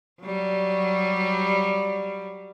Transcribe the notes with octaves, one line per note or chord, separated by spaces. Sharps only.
F#3 G3